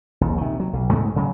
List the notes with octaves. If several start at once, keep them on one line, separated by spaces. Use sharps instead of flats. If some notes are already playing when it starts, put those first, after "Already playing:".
A#1 D#2
C3 D#3
F#3
B1
G#2 G#3 A3
C#3 F#3